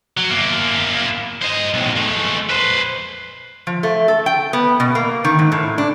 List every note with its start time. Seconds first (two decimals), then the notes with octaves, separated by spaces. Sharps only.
0.17 F#3
0.30 A#3 E4
1.42 C5 D#5
1.74 B1 A2
1.96 G#3 A3
2.50 B4 C5
3.67 F3
3.83 A3
4.08 A4
4.26 G5
4.53 B3
4.80 B2
4.95 A#3
5.24 D#3
5.39 G#2
5.52 A2
5.78 D4